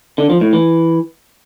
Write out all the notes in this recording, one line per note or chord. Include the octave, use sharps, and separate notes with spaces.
D3
F3
A2
E3